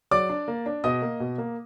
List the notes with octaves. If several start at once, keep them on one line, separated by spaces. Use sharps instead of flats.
F#3 D5 D6
D4
A#3
D4
B2 D#5 D#6
A#3
B2
A#3